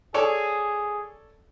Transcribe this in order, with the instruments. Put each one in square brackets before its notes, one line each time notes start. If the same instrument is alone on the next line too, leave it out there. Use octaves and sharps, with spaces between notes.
[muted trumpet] G#4 [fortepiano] A4 C#5 D5